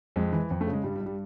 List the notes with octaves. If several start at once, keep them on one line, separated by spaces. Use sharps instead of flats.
F2 G#3
E3
F2
A3
C#3
G#3
G2 G3
G3
G2
G3